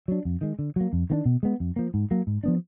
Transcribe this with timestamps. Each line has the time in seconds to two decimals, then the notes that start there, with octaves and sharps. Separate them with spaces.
0.08 F#3 D4
0.25 F2
0.41 D#3 G#3
0.59 D3
0.76 F#3 A#3
0.93 F2
1.10 D#3 A#3 D4
1.26 B2
1.43 G#3 B3
1.60 F2
1.76 F3 A#3
1.94 G#2
2.11 F#3 A#3
2.27 G#2
2.44 F3 B3 D4